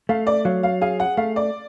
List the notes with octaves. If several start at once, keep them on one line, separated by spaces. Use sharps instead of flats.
A3 F5
D5
F#3 F5
F5
G#4 F5
F#5
A3 F5
D5